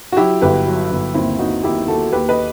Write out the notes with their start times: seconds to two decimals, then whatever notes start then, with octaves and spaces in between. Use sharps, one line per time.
0.12 F#4
0.17 F#3 E4 G4
0.41 G1 G4 B4
0.66 F#3
0.91 G1
1.14 D#2 C4 E4
1.39 D#2 D#4 F#4
1.63 D#2 E4 G4
1.88 D#2 F#4 A4
2.12 D#2 G4 B4
2.29 B4 D#5